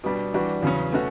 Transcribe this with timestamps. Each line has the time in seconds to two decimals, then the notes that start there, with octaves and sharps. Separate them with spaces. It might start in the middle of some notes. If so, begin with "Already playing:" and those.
0.04 B2 G3 D4
0.33 E3 G3 D4 F#4
0.62 E2 C#3 F#3 C#4
0.92 B2 A3 C#4 F#4